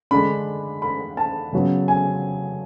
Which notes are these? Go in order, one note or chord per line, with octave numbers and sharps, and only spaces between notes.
D3 G#3 D4 B5
B5
A5
C#3 F#3 B3
G#5